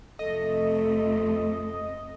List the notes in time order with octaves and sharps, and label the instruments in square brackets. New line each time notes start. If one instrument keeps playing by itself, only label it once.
[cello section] F2 C3 A3 [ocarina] A4 [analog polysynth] D#5